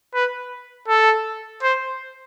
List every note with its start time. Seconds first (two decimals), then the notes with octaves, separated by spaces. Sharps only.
0.14 B4
0.88 A4
1.63 C5